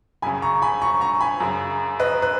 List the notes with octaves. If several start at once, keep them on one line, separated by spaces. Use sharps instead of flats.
F#2 C#3 G#5 B5
A#5 C#6
G#5 B5
A#5 C#6
A#5 C#6
G#5 B5
F#2 C#3
B4 D#5
B4